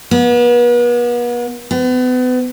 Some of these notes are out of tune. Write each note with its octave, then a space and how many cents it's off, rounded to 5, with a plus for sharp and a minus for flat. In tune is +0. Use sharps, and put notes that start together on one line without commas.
B3 -40
B3 +35